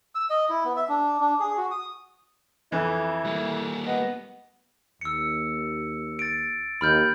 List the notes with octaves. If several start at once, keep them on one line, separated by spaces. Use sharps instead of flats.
E6
D#5
E4
B3
E5
D4
D4
G#4
F#4
D#6
F2 E3 E4
G3 A#3
B3 D#5
D#2 E6 C#7
A6 D7
D#2 B5 F6 G6